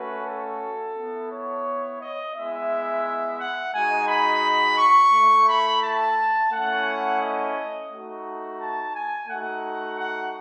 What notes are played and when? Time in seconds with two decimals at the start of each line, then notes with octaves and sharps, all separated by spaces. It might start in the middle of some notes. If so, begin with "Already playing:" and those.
Already playing: A3 C#4 F#4 B4
0.27 A4
0.97 B3 E4
1.32 C#5
2.00 D#5
2.35 G#3 B3 E4 E5
3.40 F#5
3.74 G#3 D#4 F#4 G#5
4.08 B5
4.78 C#6
5.12 A3
5.18 E4
5.48 B5
5.83 A5
6.51 A3 C#4 E4 F#5
7.20 D#5
7.91 A3 D#4 F#4
8.60 A5
8.95 G#5
9.28 A3 D#4 F#4 F#5
9.98 F#5